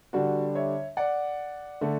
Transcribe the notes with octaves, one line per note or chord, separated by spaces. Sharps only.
D3 G3 D4 F#4
C#5 E5
D5 F#5
D3 A3